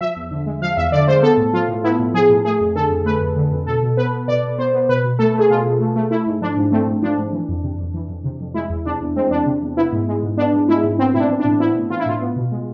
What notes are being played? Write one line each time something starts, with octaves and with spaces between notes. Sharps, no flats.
F3 E5
E2
D3
G#3
F3 F5
E2 E5
D3 D5
G#3 C5
B3 A4
A2
F3 F4
A2
B3 E4
A2
F3 G#4
A2
A3 G#4
F2
D3 A4
F2
A3 B4
F2
D3
F2
B2 A4
B2
B3 B4
B3
B2 D5
B2
B3 C5
B3
B2 B4
B2
A3 A4
A3 G#4
B2 F4
B2
A3
A3
A3 E4
G#2
F3 D4
G#2
A3 C4
G#2
F3 D4
G#2
E3
F2
C3
F2
E3
F2
C3
F2
G#3 E4
E2
C3 D4
E2
G#3 C4
E2 D4
C3
E2
B3 E4
G#2
G#3
G#2
B3 D4
G#2
G#3 E4
G#2
B3 C4
A2 E4
D4
E3
D4
A2
B3 E4
A2
E3 F4
E4
A2 F4
B3
B2
G#3